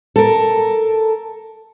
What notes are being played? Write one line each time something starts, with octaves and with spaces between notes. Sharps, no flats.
A4 A#4